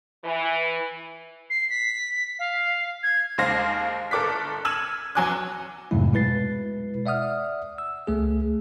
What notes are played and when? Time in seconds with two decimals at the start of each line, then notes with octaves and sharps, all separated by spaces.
0.24 E3
1.50 C7
1.70 B6
2.39 F5
3.03 G#6
3.38 D#2 G#3 C5 F5 A#6
4.11 G1 A4 A#4 D6 F#6 B6
4.65 E6 F6 G#6 D#7 E7 F#7
5.15 E2 F#3 G#5 D6 F#6
5.91 F2 G#2 C3 F#3 A3 E4
6.13 B2 G#3 E4 B4 A6 C7
7.06 D5 E5 F#5 D#6 F6
7.78 E6
8.07 C#2 A3 G#4